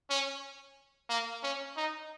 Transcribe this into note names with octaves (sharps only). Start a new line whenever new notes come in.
C#4
A#3
C#4
D#4